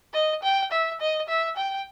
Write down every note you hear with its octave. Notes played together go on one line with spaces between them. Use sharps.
D#5
G5
E5
D#5
E5
G5